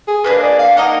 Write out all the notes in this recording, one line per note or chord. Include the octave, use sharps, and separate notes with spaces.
G#4
A#3 D4 G#4 B4
D#5
D5
F5
A#3 D#4 A#4 D#5 F#5